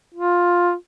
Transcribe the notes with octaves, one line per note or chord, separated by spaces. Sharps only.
F4